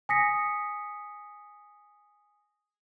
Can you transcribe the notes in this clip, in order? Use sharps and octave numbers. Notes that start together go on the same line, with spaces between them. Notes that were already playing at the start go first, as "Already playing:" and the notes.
G#5 D#6 A#6 B6 C#7